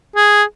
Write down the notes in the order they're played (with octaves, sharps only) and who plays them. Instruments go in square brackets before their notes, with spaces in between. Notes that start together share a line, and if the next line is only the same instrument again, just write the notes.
[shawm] G#4